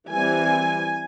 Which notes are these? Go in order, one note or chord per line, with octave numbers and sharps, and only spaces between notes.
E3 G3 C4 G#5